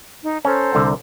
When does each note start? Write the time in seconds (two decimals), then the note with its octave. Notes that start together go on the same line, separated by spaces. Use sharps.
0.22 D#4
0.45 C#4 A4 C5 A#5
0.75 C2 D3